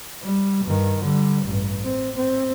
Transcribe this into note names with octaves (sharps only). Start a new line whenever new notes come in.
G3
G2 D#3
D3 G3
A1 G2
C4
C4